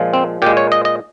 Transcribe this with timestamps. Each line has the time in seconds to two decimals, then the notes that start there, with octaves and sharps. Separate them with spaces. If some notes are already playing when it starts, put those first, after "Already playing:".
Already playing: A#2 F3 G#3
0.14 C4
0.42 A#2 G#3 G4
0.57 C#5
0.72 D#5
0.85 D#5